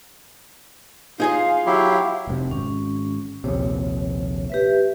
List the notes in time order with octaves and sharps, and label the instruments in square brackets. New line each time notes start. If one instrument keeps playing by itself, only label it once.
[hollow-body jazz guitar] D#4 G#4 D#5 [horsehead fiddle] F4 F5
[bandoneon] F#3 E4 G4
[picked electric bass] F1 G#2 C3
[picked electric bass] G#1 [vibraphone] C#4
[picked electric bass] A#1 D#2 C3 [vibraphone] C#5
[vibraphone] G4 B4 E5